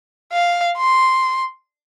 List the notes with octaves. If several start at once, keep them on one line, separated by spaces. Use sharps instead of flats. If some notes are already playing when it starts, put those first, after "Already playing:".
F5
C6